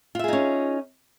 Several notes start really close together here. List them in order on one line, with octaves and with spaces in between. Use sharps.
F4 E5 G#4 D#4 C#4